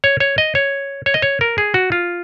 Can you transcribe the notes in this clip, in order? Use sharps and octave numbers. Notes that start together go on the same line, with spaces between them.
C#5
C#5
D#5
C#5
C#5
D#5
C#5
A#4
G#4
F#4
F4